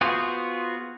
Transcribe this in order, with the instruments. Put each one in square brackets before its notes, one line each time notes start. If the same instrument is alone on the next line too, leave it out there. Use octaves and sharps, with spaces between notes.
[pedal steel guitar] B3 F4 F#4 G#4 C5